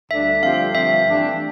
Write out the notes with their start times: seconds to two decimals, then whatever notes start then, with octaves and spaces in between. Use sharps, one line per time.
0.11 D2 D3 G3 D4 E5
0.43 G2 D3 F3 C4 G4 F5
0.74 G2 D3 F3 C4 G4 E5
1.06 E3 A3 D4 G4